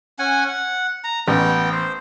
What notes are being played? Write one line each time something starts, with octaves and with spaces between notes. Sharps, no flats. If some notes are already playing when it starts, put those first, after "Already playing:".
C#4 F#5 G#5
F#5
A#5
A1 B3 G5
C5